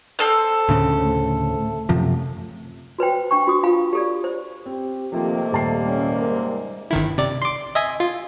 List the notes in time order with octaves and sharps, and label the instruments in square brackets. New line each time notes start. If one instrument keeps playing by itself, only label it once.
[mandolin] C4 A4 F6
[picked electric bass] D2 A2 C#3
[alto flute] A3
[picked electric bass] F#2 C3 F3
[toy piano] F#4 B4 C5 G5
D4 G5 C#6
F#4 D#6
F4 F5 B5
G4 A4 D5
C5
[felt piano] C4 [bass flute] G4
[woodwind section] C3 D#3 A#3 [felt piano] F3 C4 [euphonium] A3
[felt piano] D#1 A5 C7 [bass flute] G3
[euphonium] C#4
[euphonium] G#2 [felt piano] A#4
[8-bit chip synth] G1 D#3 E4
C3 D5
C6 D6
D#5 E5 G#5
F4